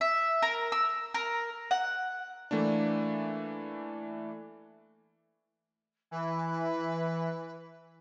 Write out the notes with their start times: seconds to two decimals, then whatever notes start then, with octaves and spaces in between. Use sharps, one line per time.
0.01 E5
0.42 A#4
0.72 E6
1.14 A#4
1.71 F#5
2.51 E3 A3 A#3 D4
6.11 E3 B4